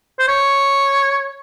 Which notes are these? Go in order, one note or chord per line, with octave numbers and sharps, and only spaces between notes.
C5
C#5